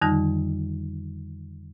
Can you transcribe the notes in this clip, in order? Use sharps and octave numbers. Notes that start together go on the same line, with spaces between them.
F2 D3 D#3 G3 D#4